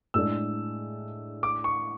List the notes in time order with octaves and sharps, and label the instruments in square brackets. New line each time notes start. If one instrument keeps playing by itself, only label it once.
[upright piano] A2 G#3 D4 [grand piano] E6
[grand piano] D6
C#6